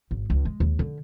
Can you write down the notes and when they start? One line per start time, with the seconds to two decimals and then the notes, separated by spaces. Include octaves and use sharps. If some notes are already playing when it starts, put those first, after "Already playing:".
0.11 G#1
0.30 C#2
0.45 G#3
0.60 D#2
0.79 D3